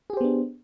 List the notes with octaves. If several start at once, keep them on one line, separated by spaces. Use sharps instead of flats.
B3 D4 G4 G#4 C5